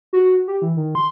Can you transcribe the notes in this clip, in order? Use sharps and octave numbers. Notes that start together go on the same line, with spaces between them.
F#4
G4
E3
D#3
C6